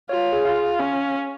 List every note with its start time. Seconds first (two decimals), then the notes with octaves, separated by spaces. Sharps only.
0.09 F4 C#5
0.32 G#4
0.45 F4 F5
0.80 C#4